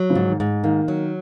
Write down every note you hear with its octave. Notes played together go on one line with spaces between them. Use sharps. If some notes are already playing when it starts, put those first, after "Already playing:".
Already playing: F#3
C#3 F3
G#2
D#3
G#2
D#3 A#3
F#3